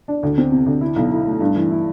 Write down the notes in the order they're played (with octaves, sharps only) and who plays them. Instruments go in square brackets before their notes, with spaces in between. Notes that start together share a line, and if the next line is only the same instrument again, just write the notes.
[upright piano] D4
D2
C4
C3
D2
E4
B1
E4
A3
G2
E3
E4